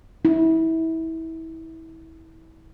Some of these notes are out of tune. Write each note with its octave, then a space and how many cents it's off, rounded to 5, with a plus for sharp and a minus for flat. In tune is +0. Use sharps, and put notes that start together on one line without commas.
E4 -25